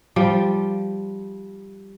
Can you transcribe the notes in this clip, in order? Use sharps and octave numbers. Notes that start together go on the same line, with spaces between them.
F3 G3